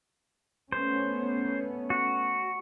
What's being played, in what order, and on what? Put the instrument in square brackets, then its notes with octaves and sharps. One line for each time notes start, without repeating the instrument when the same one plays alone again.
[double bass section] A3 B3 C#4 [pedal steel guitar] C5
[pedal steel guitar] F#4